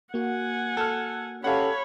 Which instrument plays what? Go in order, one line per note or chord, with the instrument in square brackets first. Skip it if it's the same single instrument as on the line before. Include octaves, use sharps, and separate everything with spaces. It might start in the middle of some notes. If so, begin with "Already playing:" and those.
[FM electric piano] A#3 F#4 [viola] F#5 G#5
[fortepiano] A4 F6
[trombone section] C#4 G4 A4 [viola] C#5 B5 [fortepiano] F5 F#5